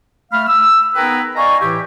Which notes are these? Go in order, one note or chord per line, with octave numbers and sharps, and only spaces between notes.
A3 F5 B5 F6
E6
B3 D#4 G#4 A#4 B4 G5
D5 D#5 F5 G#5 A#5 C#6
A2 E3 E4 G4